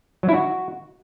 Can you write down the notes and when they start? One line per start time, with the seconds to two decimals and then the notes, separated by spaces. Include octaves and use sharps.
0.23 F#3
0.29 E4
0.34 F#4